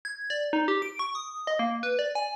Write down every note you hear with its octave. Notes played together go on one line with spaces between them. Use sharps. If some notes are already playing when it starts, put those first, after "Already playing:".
G#6
D5
D#4
G4
D7
C#6
D#6
D#5
A#3
B4
D5
G#5